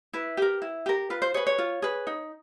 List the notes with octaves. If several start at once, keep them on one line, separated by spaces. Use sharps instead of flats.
E4 B4
G4 A#4
E4
G4 A#4
F4 B4
C5
G#4 B4 C#5
C#5
F4
G#4 B4
D#4